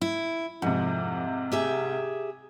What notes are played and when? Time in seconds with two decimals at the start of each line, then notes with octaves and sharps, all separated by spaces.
0.01 E4
0.62 F2 G#2 C3
1.52 G4 G#4 E5